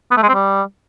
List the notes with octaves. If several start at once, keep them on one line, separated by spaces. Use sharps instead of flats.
B3
A3
G#3
C4
G3